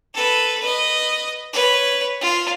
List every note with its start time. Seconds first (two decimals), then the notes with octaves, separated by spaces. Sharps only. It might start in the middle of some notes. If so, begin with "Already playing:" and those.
0.14 A4 B4
0.60 B4 D#5
1.53 B4 C#5
2.21 F4